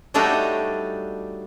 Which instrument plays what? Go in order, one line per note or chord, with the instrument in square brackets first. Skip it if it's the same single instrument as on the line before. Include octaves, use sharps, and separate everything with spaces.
[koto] F#3 G3 A3 D4 D#4 F#4